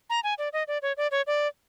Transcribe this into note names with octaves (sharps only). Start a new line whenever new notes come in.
A#5
G#5
D5
D#5
D5
C#5
D5
C#5
D5